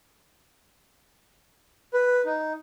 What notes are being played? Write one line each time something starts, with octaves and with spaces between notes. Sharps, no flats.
B4
D#4